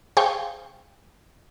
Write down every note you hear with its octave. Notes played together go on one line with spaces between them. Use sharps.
G#4 C5 F5 G5 C#6